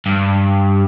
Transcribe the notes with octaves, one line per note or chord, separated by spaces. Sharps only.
G2